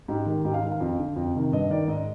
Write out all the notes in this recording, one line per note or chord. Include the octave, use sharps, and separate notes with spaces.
G#2 G4
D#3
G#2 G4
F5
D#3
F5
F2
D3
F2
C3 D#3
G2 D#5
D#3 D5
G#2 D#5